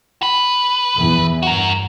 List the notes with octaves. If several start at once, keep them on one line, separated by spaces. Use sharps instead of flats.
B4
E2 E3
G2 F#4 A#4